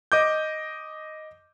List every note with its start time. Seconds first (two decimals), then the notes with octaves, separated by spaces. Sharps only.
0.12 D#5 D6 G6